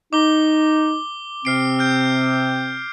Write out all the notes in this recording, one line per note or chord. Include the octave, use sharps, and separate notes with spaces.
D#4 D6 G7
C3 C4 F6 C7 D7
F6 G6 D7